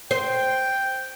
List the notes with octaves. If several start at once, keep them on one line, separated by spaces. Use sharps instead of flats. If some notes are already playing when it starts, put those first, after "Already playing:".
C5 G5